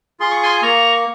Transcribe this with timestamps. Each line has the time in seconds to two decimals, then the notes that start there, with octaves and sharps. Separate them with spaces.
0.20 F4 G#4 C6
0.31 C#6
0.43 G#5 C6
0.62 A#3 A#5 C#6